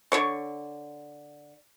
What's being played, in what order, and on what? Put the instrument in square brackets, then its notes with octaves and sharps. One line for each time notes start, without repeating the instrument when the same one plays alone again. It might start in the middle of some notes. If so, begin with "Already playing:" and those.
[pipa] D3 C#5 C#6